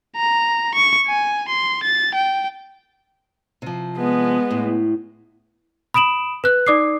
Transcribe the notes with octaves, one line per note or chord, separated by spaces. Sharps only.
A#5
C#6
G#5
C6
A6
G5
C3 F3
G#3 B3
A2
B5 D#6 D7 E7 F#7
B4 F#6
D#4 D5 D6 D#6 C7